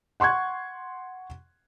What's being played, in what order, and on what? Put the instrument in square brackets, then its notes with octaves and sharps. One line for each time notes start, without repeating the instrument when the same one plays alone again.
[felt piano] F#5 C6 C#6 F#6 G#6